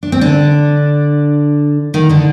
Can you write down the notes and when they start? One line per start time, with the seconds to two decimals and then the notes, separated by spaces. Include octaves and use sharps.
0.03 D4
0.12 C4
0.21 D3 D4
1.94 D#3 D#4
2.10 D3 D4